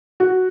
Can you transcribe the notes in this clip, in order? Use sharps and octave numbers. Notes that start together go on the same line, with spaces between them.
F#4